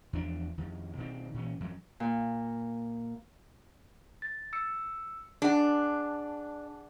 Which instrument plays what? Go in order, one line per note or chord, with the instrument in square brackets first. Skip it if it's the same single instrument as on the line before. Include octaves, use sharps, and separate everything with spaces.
[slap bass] E2 F3 D4
F2 D#3
B2 D#3 C4
A#2 E3 C#4
F#2 F3 F#3
[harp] A#2
[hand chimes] A6
E6 C#7
[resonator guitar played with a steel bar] D4 [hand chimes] G#4 F#5 A5